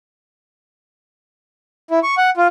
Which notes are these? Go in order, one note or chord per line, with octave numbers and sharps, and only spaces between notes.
E4
C#6
F#5
F4